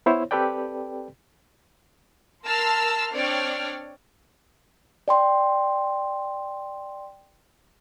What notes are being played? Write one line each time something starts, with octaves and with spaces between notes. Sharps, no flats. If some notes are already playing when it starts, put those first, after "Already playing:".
B3 E4 C5 C#5
C4 G4 A4 B4 D5 G5
A#4 A5 C6 E6 F6
C4 D4 C#5 D5 G5 F6
D5 G5 C6